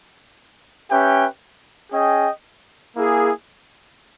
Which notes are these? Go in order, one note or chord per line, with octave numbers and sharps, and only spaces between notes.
C#4 G4 B4 E5 G5
C#4 G#4 D#5 G5
A#3 E4 G#4